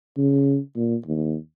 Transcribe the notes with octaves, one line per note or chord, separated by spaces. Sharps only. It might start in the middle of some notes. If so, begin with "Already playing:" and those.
C#3
A#2
D#2